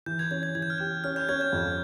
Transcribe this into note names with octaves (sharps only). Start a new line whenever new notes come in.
E3 G6
G#6
C#4 G#6
G#6
E3 G#6
G6
F6
G4 G6
C#4 F6
G6
C#4 G#6
G6
F2